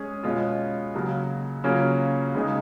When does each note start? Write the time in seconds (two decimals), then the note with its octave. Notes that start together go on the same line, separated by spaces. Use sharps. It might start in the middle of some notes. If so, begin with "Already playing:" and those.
Already playing: G#3 C#4 G#4
0.24 B2 G#3 C#4 F4
0.94 C#3 F#3 A#3
1.64 C#3 F#3 A#3 C#4 F4
2.35 C#3 G#3 D#4 G#4